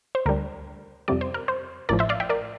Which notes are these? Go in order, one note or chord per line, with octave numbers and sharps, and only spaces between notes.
C5
D2 D3 G3 D4 A#4
F2 C3 G3 D5
C5
A#4
C5
A1 A2 F3 A#4 D5
C5 E5
D5 F5
E5 G5
A#4 D5